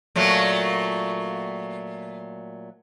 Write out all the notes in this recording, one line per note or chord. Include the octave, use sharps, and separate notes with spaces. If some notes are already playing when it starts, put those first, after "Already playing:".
A#2 F#3 A3